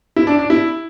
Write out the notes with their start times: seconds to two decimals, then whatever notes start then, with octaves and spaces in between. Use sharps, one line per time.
0.16 E4
0.27 D4
0.39 D4
0.50 E4